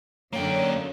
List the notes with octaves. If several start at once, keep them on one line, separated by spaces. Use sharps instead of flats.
F#2 D3 A#3 C#5 G5